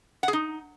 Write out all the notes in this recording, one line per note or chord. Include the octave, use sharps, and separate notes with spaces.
F#5
G#4
D#4